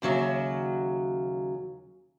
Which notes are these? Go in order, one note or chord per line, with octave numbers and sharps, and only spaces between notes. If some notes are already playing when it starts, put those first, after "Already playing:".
D#2 C#3 F#3 E5